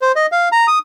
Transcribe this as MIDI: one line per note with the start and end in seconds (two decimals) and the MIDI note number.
0.02 0.12 72
0.16 0.26 75
0.32 0.49 77
0.52 0.67 82
0.68 0.79 87